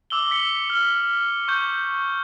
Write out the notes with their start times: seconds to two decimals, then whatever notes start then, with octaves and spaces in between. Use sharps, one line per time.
0.10 D6 E6 F#7 G7
0.31 B6 C#7 G7
0.70 F6 G7
1.48 C#6 G6